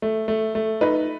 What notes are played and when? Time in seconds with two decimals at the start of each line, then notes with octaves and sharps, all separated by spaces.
0.02 A3
0.28 A3
0.55 A3
0.81 D#4 B4